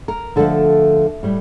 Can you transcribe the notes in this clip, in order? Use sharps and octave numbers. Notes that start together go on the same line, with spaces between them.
A#4
D3 F3 A3 A4
A2 G3